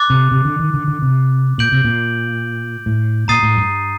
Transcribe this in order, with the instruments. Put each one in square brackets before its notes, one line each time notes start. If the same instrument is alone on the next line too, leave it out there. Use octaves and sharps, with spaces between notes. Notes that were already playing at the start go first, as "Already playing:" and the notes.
Already playing: [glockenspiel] D6 F#6 A6
[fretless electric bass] C3
C3
D3
D#3
D3
D3
C3
[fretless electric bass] A#2 [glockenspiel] G6 D7 F#7
[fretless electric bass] C3
A#2
A2
[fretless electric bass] A#2 [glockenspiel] A#5 D#6 A6 C7 D#7
[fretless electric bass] A2
G2